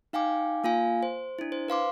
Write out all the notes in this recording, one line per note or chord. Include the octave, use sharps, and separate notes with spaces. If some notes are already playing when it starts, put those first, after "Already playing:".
D#4 F5 G5 G#5 D6
A#3 F4 F5 G#5
C5
D4 E4
C5
B4 F5 C6 D6